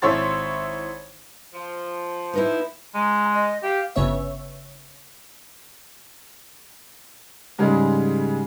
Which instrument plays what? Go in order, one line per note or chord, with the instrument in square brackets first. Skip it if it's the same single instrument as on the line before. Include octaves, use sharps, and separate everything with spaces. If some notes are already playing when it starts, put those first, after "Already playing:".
[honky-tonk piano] G#1 E4 C#5 C6 A6
[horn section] F3
[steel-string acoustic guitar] B3 D#4 E4
[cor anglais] G#3 [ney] A#5
[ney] D#5
[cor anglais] G4 [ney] F5
[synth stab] G1 C#3 B3 C#5 E5
[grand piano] G#2 C#3 G3 G#3